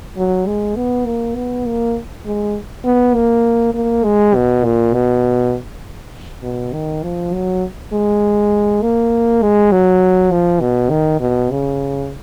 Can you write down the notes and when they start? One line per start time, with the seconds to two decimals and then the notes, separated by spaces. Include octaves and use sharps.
0.17 F#3
0.47 G#3
0.76 B3
1.06 A#3
1.36 B3
1.66 A#3
2.26 G#3
2.85 B3
3.15 A#3
3.74 A#3
4.04 G#3
4.35 B2
4.65 A#2
4.94 B2
6.43 B2
6.74 D#3
7.03 F3
7.33 F#3
7.93 G#3
8.82 A#3
9.42 G#3
9.72 F#3
10.32 F3
10.61 B2
10.90 D#3
11.21 B2
11.51 C#3